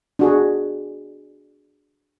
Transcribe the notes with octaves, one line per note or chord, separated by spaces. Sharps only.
D4 F#4 G#4